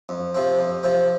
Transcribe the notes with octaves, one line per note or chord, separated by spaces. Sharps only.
F2
C3 F3 C4
F2
C3 F3 C4